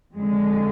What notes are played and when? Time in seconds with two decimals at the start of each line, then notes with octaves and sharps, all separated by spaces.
0.15 F2 D3 G#3